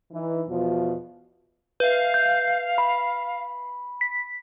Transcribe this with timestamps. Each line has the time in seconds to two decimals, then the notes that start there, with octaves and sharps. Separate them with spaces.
0.12 E3 D#4
0.48 E2 B2 F3
1.80 B4 E5 F5 G6
2.14 G6
2.78 B5
4.01 B6